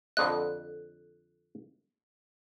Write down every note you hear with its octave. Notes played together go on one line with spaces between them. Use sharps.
F2 D3 D#5 F#6